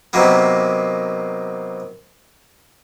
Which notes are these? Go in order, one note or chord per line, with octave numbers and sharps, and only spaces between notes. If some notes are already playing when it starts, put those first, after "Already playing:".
C3 D#3 F#3 A#3 B3